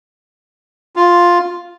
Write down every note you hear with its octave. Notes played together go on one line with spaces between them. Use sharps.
F4